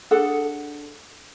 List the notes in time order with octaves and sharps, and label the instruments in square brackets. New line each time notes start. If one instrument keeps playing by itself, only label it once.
[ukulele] D4 G#4 A4 F#5